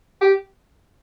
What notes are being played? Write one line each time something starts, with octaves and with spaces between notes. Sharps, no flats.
G4